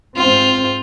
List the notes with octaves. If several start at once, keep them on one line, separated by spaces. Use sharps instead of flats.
G#2 C4 F4